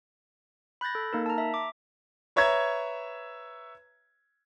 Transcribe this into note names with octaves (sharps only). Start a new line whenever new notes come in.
B5 F#6 G6 A6 A#6
A4
A#3 D#4 A#4
A5 A#5
E5
D6
B4 C#5 E5 A#5 G#6